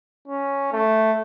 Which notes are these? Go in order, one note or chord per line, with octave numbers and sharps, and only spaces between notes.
C#4
A3